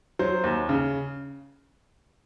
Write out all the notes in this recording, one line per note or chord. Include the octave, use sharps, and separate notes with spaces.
F#3 C5
D#2
C#3